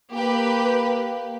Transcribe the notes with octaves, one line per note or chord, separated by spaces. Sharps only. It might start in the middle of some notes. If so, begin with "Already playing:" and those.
A#3 G4 B4